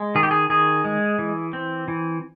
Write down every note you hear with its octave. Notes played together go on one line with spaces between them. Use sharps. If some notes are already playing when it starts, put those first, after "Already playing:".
Already playing: G#3
D#3 G#4
G4
G#4
D#3 G#4
G#3
E3
C4
E3